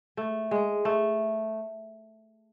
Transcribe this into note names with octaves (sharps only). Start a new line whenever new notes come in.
A3
G#3
A3